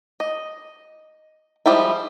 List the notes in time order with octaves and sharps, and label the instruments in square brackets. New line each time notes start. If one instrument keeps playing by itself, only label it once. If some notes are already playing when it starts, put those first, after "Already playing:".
[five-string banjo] D#5
F3 G3 G#3 E4